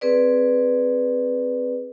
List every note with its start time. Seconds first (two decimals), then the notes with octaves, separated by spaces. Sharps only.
0.01 C4 G#4 B4 D5